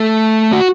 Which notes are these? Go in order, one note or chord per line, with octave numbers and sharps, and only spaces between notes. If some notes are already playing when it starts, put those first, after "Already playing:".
Already playing: A3
F#4